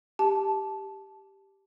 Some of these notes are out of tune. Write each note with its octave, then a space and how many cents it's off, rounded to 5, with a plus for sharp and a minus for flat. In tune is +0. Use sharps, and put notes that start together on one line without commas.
G4 +0 A5 -15